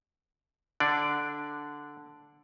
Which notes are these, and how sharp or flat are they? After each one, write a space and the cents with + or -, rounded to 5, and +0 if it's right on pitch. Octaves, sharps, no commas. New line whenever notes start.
D3 +0 D4 +0 D5 +0